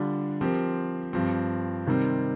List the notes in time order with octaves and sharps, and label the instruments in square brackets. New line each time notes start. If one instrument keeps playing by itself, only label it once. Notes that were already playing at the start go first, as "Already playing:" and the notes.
Already playing: [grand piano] D3 G3 D4 F4
F3 C4 G4 A#4
G2 F3 C4
C3 D#3 G3 C4